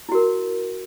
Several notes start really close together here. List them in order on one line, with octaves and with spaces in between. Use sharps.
E4 F#4 A#4